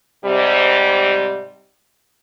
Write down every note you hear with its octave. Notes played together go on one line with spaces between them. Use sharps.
G#2 C3 G3